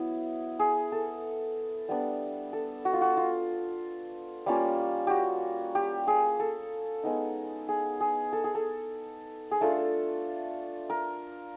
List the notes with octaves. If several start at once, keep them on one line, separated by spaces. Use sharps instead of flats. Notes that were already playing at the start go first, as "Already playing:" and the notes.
Already playing: F#3 B3 E4
G#4
A4
G3 B3 D4
A4
F#4
F4
F#4
F4
G3 A#3 C#4 F4
F#4 G4
G4
G#4
A4
G#3 B3 D#4
G#4
G#4
A4
G#4
A4
G#4
A3 D4 F4 A4
A#4